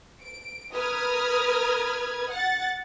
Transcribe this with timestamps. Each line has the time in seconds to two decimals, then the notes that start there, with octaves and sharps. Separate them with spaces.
0.21 D7
0.72 A#4 B4 D#6 F6 G#6
2.31 F#5 A6